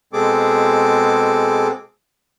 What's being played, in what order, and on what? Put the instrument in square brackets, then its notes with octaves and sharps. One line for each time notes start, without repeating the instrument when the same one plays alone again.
[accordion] B2 G#3 C4 G#4 A4 D6